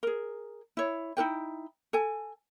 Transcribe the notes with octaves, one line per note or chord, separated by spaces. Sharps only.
G#4 A#4
E4 C#5
D#4 E4 A#4 G5
A4 G#5